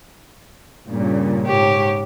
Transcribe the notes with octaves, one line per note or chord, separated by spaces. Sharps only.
G2 A#2 C#3
G#2 G4 C#5